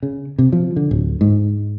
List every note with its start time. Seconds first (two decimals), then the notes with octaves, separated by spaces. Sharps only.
0.03 C#3
0.38 C3
0.52 F3
0.76 D3
0.91 D1
1.21 G#2